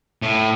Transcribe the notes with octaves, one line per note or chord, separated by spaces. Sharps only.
A2